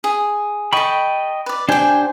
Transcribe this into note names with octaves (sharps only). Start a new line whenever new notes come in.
G#4
A4 D#5 G5 B5 C#6
B4 D5
D4 G4 C5 G5 G#5